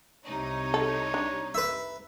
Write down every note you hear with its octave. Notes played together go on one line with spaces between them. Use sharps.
C2 C3 D#4 C#5
A4
D4
B4 E5